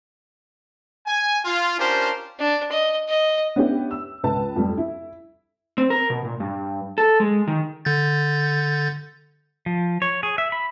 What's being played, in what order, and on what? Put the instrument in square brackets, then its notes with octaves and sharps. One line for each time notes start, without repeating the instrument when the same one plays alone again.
[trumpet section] G#5
F4
C#4 D4 F4 G4 A#4 C5
[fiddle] D4
D#5
D#5
[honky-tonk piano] B3 C#4 D4 E4 G4
E6
C#2 B4 A5
F2 G3
E4
[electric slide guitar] C4
A#4
B2
A#2
G2
A4
G#3
D#3
[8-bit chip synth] D3 G6 A6
[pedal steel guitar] F3
C#5
G#4
E5
B5